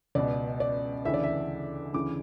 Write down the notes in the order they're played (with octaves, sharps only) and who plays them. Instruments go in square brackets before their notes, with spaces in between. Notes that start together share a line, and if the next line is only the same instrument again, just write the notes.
[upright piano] C#2 B2 D5
D5
D2 C#3 E3 E5
D5
E5
D2 C#3 E3 D6